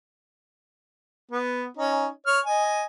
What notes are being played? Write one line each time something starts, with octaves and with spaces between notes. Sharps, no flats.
B3
C#4 D#4
C#5 F6
D#5 G#5